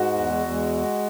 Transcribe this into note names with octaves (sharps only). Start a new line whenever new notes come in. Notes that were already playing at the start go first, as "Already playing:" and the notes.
Already playing: G#2 G#3 F#4
E2
G#3